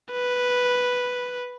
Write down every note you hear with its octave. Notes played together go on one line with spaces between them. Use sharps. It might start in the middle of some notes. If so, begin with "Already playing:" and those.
B4